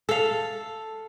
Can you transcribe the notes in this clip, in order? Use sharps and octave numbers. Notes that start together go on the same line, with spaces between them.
A4 F5